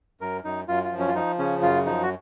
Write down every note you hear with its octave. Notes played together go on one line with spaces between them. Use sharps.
F#2 A#4
F#2 D#4
F#2 F4
F4
F3
C#4
F4
F3 D#4
C#3 C#4
F#2 F4
F3 D#4
F#4